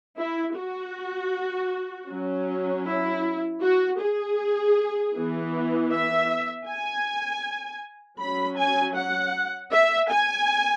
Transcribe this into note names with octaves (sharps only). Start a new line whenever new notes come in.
E4
F#4
F#3 C#4
E4
F#4
G#4
E3 B3
E5
G#5
F#3 C#4 B5
G#5
F#5
E5
G#5